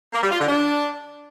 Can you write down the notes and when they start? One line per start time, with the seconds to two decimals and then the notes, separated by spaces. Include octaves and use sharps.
0.13 A#3
0.22 G3
0.31 F4
0.40 D3
0.48 D4